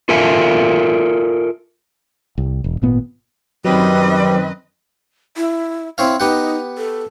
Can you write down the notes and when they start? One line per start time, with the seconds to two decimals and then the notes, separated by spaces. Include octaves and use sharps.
0.09 F4 A4 A#4 E5 F5 G#5
2.38 C2
2.64 E1
2.82 G#1 A#2 B3
3.65 F#2 D#3 F#3 G3 C4 B4 D#5
5.37 E4
5.98 C4 E4 C#5 F5
6.20 B3 D#4 G4 F#5
6.78 A4